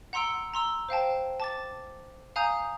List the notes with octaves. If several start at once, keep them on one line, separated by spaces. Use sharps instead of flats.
F#5 A#5 C6 E6 D7
A#5 C6 E6
C5 F5 G5 A5
A5 D6 A6
F5 G#5 A#5 D#6 G6